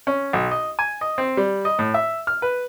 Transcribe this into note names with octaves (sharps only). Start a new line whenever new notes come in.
C#4
B1
D#5
G#5
D#5
C4
G3
D#5
A2
E5
F6
B4